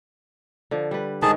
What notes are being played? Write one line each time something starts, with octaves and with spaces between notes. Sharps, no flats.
D3 F3
G3 B4
G#2 D#3 G#3 G#4 A5